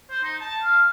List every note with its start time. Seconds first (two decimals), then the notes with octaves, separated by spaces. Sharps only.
0.10 C5
0.24 D#4
0.41 A5
0.62 F5